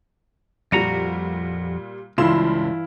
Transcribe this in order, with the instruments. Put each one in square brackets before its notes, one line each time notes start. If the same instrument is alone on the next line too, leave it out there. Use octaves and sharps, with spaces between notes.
[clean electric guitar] F2 F#4 A#5 [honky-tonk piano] A#2 G3 [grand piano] D#7
[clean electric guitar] C#2 [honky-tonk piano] G2 C6 E7 [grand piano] E3 E4 F4